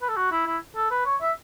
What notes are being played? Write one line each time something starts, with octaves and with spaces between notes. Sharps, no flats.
B4
A4
F#4
E4
E4
A4
B4
C#5
E5